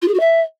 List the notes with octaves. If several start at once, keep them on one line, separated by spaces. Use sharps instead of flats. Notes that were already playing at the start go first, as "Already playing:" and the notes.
F4
G#4
F#4
E5